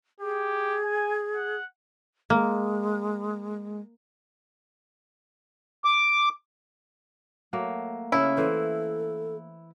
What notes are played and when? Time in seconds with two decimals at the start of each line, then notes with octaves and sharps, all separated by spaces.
0.20 G4 G#4
0.85 G#5
1.36 F#5
2.30 G#3 A#3
5.85 D6
7.53 F#3 A3 A#3
8.12 C#3 C#4 E4
8.37 E3 A4 C5